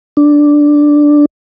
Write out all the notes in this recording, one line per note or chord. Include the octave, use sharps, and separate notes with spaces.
D4